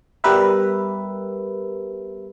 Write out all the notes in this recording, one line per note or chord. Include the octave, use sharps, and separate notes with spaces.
G3 B3 G4 A#4 B4 E5